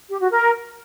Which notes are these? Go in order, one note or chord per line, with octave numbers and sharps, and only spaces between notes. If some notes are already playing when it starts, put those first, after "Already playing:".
G4
F#4
A#4